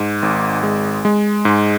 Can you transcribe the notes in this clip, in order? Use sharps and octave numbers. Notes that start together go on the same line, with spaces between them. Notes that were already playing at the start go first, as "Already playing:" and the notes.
Already playing: G#2
G#1
G#3
G#3
G#2